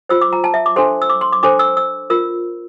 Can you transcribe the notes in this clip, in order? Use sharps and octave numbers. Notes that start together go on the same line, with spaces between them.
F4 C5 E6
D6
A#5
A5
E5
D6
D4 A4 C5 C6
E6
D6
C6
D6
D4 A4 C5 D6
E6
E6
F4 A#4 E6